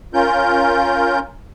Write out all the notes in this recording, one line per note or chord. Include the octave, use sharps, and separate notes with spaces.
C#4 F4 A#4 G6